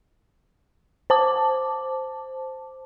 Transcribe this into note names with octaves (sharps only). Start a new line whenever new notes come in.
C5 A5 D6